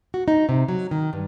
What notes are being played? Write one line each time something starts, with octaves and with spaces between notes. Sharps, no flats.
F#4
D#4
C3
F#3
D#3
G2